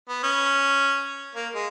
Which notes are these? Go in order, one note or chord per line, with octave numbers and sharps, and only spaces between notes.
B3
C#4
A#3
G#3